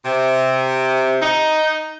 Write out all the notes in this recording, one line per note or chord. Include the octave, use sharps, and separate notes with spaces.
C3
D#4